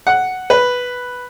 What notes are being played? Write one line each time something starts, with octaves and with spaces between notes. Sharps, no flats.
F#5
B4